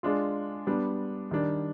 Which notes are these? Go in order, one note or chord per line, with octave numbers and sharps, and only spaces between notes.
G#3 D4 F4
G3 B3 D4
D#3 G3 D4